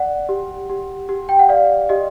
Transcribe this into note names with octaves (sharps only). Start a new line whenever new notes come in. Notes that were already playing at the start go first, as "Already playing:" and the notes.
Already playing: D5 F#5
G4
G4
G4
G5
F#5
D5 F5
G4 D#5